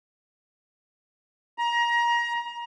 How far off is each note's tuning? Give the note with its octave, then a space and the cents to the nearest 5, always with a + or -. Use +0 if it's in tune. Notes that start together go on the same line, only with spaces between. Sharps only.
A#5 +25